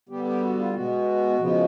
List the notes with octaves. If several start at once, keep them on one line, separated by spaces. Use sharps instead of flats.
D3 G3 B3 G4
G4
F#4
F4
B2 G#3 B3 F#4
C#3 F3 G#3 B3